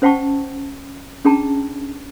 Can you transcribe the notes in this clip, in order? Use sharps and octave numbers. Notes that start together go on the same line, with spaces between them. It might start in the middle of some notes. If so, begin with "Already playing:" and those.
C#4 C5 F#5 G5 A5 C#6
C#4 D4 G#4 G5 A5 A#5